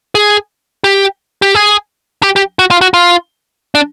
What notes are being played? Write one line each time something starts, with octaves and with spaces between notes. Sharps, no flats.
G#4
G4
G4
G#4
G4
G4
F#4
F4
F#4
F4
D4